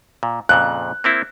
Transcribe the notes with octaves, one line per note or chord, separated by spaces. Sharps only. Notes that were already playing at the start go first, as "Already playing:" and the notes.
A#2
F2 A#2 C#3 F#6
A#3 C4 E4